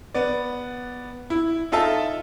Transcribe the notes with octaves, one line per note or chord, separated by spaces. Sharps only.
B3 D5
E4
D#4 F4 A4 E5 A5